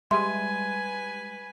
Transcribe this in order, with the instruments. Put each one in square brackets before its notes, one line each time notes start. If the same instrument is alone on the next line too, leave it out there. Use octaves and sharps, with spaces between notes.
[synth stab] G3 G#3 [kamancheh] B4 G#5 [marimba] E5 C6